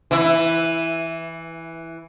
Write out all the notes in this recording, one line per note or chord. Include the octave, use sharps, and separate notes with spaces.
E3 E4